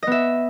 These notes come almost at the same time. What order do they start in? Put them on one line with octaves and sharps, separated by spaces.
D#5 B3 E5